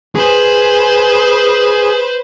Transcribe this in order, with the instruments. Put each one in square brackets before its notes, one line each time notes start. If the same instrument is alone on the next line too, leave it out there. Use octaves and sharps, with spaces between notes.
[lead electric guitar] G#4 [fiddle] B4 C5